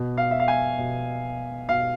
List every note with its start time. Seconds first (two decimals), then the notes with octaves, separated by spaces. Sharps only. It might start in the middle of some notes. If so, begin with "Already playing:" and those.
Already playing: B2
0.17 F5
0.31 E5
0.40 F5
0.48 G#5
0.78 B2
1.69 B2 F5